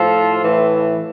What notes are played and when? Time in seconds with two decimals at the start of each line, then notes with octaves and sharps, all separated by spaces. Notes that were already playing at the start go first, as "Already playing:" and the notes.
Already playing: A2 F3 F4 A4
0.41 A2 E3